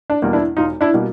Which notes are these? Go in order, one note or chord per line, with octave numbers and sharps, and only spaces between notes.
D4
E2 B2 G3 A#3
D4 E4
E1 D#4 F4
D4 E4
B2 G3 A#3